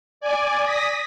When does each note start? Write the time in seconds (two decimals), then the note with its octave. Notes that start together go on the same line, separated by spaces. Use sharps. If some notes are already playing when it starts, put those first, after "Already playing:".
0.21 D5 G#5 D6
0.63 D#6 A#6 B6